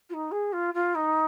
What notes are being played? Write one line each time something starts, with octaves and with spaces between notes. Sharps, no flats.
F4
D#4
G#4
F4
F4
D#4